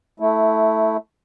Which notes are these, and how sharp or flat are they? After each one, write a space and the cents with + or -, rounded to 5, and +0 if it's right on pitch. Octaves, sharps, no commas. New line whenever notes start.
A3 +0 E4 -15